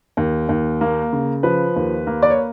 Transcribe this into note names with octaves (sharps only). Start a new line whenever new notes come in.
D#2
D#2
A#3
C#3
F3 B4
D#2
A#3
D5
C#5